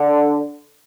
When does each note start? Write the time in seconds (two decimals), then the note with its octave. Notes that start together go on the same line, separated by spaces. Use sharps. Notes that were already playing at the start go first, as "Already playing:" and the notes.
Already playing: D3